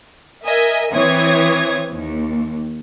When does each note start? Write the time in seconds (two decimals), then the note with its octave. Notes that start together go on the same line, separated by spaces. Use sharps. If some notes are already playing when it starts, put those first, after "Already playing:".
0.45 A#4 D#5 E5 G#5
0.93 E3 C4 C#5 D#6 G#6
1.89 D#2